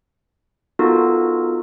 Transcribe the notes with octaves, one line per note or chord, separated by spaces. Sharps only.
B3 D#4 F4 F#4 A4 A#4